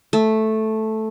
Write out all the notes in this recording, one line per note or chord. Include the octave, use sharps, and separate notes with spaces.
A3